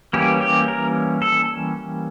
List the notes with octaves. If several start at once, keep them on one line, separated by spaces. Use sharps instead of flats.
E3 G3 A#3 C#4 G4
G4
A#4
A4